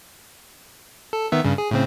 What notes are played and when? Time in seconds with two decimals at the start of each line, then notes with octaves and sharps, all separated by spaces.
1.13 A4
1.32 D#3 B3 E5
1.44 G2 C#3
1.58 G#4
1.71 A2 C#3 C4